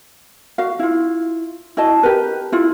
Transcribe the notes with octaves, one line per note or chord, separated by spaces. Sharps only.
F#4 F5
E4 F4
E4 F#4 D#5 A5
G4 A#4 B4
E4 F4